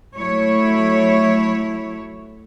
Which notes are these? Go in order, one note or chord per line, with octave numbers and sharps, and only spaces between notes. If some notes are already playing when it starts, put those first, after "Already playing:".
F#3 A3 E4 C#5